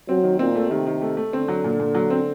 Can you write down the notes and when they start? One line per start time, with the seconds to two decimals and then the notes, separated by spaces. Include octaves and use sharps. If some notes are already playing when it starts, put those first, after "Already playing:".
0.09 F#3 C4
0.24 D#3
0.39 A#2 C4
0.55 A3
0.71 C3 D#3
0.87 D#3
1.02 A3
1.17 A3
1.33 D3 C4
1.48 F#3
1.64 A#2
1.80 A#2
1.95 F#3
2.10 C4